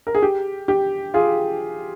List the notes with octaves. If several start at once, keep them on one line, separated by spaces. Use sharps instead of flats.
A#4
G#4
G4
G4
F4 G#4